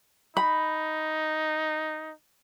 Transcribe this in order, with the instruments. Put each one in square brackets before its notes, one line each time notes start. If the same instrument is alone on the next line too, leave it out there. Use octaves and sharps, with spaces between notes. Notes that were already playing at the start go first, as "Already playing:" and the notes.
[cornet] D#4 [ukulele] B5